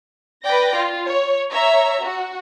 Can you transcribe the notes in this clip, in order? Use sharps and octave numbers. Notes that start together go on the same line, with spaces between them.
B4 D5 G5 A#6
F4
C#5
C#5 E5 A#5
F#4